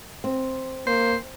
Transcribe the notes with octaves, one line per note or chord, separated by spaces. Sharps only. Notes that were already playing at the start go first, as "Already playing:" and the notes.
C4
A#3 C5